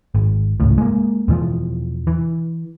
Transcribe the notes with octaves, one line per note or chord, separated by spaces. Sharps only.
G#1
G#1 C#2 A2
G#3 A#3
E2 B2 E3 F3
E3